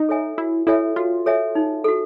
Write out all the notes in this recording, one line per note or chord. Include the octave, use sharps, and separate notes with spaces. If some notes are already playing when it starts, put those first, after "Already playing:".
Already playing: D#4
A4 C#5 E5 G#5
E4 F#4
E4 A4 C#5 E5 G#5
F4 F#4
A4 C#5 E5 G#5
D#4
F#4 A4